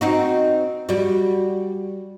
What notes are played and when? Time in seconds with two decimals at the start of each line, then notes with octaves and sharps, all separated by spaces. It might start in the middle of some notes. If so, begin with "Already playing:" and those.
0.01 C4 D#4 F#4
0.89 G3 F#4